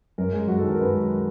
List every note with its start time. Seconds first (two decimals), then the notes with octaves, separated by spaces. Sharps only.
0.18 F#2 A#4
0.33 G#3
0.48 F#2 F#4
0.58 A4
0.63 D#3
0.69 A#4
0.79 F#2 B4
0.94 G#3